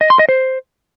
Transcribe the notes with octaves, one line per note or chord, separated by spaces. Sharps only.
D#5
C6
D#5
C5